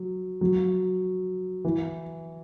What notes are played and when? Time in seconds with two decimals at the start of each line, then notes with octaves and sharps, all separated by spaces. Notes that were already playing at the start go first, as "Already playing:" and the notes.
Already playing: F#3
0.41 F#3
1.65 E3